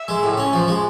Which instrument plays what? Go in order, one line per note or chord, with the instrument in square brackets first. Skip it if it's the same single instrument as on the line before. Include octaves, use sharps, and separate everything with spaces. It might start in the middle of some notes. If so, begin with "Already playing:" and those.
Already playing: [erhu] E5
[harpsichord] G#3
A2
C#4
F3
G#3